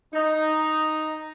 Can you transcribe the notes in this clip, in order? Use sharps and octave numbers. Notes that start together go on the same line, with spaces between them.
D#4